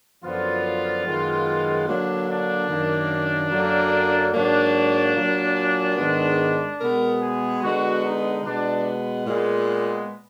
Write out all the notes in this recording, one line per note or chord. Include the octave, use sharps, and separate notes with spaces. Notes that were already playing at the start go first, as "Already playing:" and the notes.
F#2 D3 F3 B3 F4
F#2 D#3 G#3 B3
D3 F#3 A#3 D4
D4
F#2 D#3 A#3
F#2 D3 F#3 A#3
G#2 F#3 A#3 D4
A#2 F#3 A#3
G#2 D#3 G#3 B3
B2 G#3 B3 A#4
G#4
D3 G#3 B3 F#4
D#4
B2 G#3 B3 D4
A#2 G#3 B3